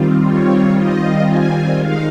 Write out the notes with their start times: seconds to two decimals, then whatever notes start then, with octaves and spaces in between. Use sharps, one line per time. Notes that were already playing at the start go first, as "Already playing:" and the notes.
Already playing: D#3 G3 C4 F4
0.26 C#5
0.76 D#5
1.27 G#5
1.77 D#3 G#3 D#4 F5